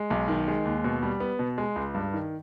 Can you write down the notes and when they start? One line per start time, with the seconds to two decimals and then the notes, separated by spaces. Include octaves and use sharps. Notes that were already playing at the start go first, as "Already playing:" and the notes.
Already playing: G#3
0.10 B1
0.28 D#3
0.48 G#3
0.65 D#2
0.84 B2
1.03 G3
1.20 B3
1.39 B2
1.58 G#3
1.76 C#2
1.94 G2
2.13 D#3